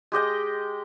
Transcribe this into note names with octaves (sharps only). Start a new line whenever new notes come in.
G#3 G4 D#5 G5